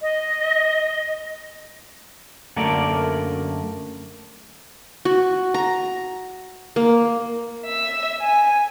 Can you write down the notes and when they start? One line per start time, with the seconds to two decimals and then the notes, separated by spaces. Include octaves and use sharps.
0.01 D#5
2.56 F#2 D3 A3 A#3 A#4 D5
5.05 F#4
5.54 A#5
6.76 A#3
7.66 E5
8.22 G#5